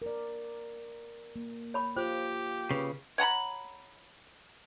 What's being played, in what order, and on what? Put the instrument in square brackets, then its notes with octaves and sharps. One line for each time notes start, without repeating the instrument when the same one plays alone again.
[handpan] A#4 D5
A#3
[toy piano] C#5 B5 C#6
[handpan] F4 [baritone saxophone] G4 [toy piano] C5
[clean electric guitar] C#3 [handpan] B4
[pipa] C#5 F#5 A#5 B5